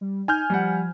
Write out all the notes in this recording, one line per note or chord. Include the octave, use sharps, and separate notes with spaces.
G3
D#4 G#5 F6 G6
F3 G3 F#5